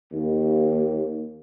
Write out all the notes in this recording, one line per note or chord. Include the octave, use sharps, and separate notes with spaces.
D#2